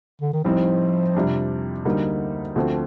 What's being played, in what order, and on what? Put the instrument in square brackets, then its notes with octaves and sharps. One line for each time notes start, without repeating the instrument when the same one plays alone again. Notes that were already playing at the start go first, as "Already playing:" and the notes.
[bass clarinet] D3
D#3
[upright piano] A2 G3 C4 D#4 [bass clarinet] F3
[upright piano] F2 C3 G3 D4
D2 D3 G3 A#3 D#4
D2 D3 F3 A3 C4